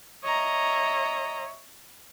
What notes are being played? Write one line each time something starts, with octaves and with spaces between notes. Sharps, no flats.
C#5 D#5 E5 A#5